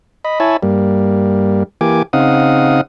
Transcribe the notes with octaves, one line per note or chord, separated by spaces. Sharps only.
D#5 B5
E4 C#5 E5 G#5 A5 B5
G2 G3 A#3
E3 A#3 G4 G#5 D6
C#3 C4 D#4 F5 F#5 D#6